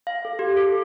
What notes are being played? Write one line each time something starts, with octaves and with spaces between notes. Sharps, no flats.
F5
A4
G4
A4